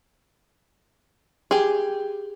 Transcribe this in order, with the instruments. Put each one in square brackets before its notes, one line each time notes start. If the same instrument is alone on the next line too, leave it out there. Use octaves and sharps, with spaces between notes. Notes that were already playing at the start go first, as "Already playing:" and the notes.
[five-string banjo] G4 G#4